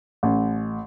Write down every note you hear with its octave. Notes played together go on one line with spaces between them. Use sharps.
A1